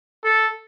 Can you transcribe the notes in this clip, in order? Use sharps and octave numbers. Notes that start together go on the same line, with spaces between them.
A4